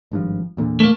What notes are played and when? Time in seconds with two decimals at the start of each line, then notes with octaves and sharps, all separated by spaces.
0.12 G#1 G2 F3
0.57 E2 A#2 D3
0.80 A3 A#3